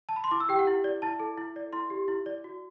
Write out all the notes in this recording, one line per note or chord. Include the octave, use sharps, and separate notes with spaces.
A5
B5
C6
E4 D6
E6
G4 G5
F#5
E4
D5
E4 A5
A4
E4
D5
E4 C6
G4
E4
D5
F#4